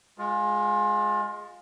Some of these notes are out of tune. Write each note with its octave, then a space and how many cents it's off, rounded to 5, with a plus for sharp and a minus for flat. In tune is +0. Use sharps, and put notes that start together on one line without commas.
G#3 +0 F4 +25